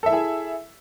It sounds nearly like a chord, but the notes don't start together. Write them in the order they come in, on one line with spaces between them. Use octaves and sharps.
A4 E5 E4 G#4